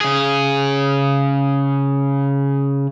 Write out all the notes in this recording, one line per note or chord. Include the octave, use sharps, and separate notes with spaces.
C#3 G#4